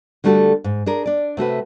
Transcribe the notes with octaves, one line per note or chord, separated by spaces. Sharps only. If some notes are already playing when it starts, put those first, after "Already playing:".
D3 G3 A3 F#4 G#4 A4
G#2
D4 G#4 A#4
D4 D5
C3 A3 F#4 B4